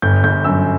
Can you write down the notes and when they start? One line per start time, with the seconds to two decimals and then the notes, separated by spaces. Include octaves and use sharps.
0.02 G1 G6
0.24 G1 G6
0.44 F#2 E6